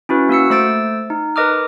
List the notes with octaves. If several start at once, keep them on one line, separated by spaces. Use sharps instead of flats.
C#4 E4 F#4 B4
A#3 F#4 E6 C#7
A3 C5 E6 A6 D7
D#4
A#4 B4 D#5 D6 D#6 F6